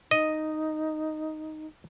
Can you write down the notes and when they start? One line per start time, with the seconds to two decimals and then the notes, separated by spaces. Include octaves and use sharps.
0.11 D#4 D#5